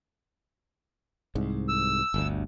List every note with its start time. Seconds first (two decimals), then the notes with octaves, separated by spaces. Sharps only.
1.35 C2 G#2
1.69 E6
2.14 G1 D2